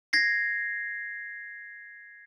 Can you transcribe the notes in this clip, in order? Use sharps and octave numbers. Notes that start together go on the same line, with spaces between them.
G#6 A#6 C7